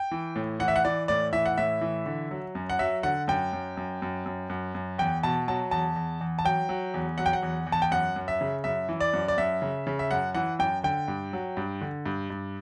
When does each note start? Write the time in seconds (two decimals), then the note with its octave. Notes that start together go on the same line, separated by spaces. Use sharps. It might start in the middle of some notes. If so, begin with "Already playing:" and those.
Already playing: G5
0.11 E3
0.36 A2
0.59 E3 F#5
0.68 E5
0.76 F#5
0.85 E3 D5
1.08 A2 D5
1.33 E3 E5
1.46 F#5
1.58 A2 E5
1.81 E3
2.06 D3
2.31 F#3
2.55 F#2
2.70 F#5
2.79 F#3 E5
3.03 D3 F#5
3.28 F#2 G5
3.53 F#2
3.77 F#2
4.02 F#2
4.26 F#2
4.50 F#2
4.75 F#2
4.98 E2 G5
5.23 B2 A5
5.48 F#3 A5
5.71 E2 A5
5.96 E2
6.21 E2
6.39 A5
6.45 F#3 G5
6.69 F#3
6.94 E2
7.18 F#3 F#5
7.26 G5
7.33 F#5
7.43 E2
7.66 E2
7.72 A5
7.82 G5
7.91 F#2 F#5
8.16 F#2
8.28 E5
8.41 C#3
8.64 F#2 E5
8.89 E3
9.00 D5
9.13 F#2
9.28 D5
9.38 F#2 E5
9.62 C#3
9.87 C#3
9.99 E5
10.11 F#2 F#5
10.35 E3 F#5
10.59 F#2 G5
10.83 D3 G5
11.08 G2
11.33 F#3
11.57 G2
11.81 D3
12.06 G2
12.30 G2